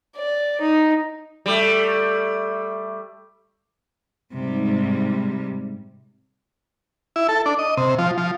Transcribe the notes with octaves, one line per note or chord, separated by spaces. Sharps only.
D5
D#4
G3 A3
G#2 C3 G3
E4
A4
D4
D#5
C3
F3
F3